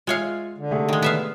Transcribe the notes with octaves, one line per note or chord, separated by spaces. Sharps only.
G#3 F4 C#5 E5 F5
D3
C3 A3 G#4
D#3 G#3
B3 E5 F5